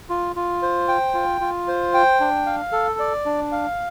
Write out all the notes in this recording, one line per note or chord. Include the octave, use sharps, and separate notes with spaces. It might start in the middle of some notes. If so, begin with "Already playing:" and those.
F4
F4
C5
G5
F4
F4
C5
G5
D4
F5
A4
D5
D4
F5